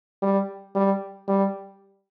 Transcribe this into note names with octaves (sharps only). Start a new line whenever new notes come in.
G3
G3
G3